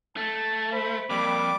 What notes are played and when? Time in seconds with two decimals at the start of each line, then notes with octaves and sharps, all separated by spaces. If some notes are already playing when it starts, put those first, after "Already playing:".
0.17 A3 A5
0.73 C5 B5
1.10 F2 G3 A#3 B5 D6